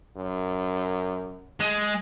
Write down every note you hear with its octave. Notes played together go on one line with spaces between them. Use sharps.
F#2
G#3